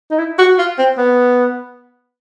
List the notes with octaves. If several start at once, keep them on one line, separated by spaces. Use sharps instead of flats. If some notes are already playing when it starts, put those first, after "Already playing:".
D#4
E4
F#4
F4
C4
B3